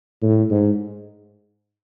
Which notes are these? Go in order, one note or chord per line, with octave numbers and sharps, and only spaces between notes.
A2
G#2